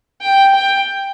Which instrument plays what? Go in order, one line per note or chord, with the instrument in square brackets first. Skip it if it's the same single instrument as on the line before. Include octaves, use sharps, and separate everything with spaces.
[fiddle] G5
G5